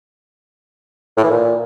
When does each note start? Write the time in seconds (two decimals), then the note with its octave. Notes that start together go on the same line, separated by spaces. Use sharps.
1.17 A2
1.24 E3
1.30 A#2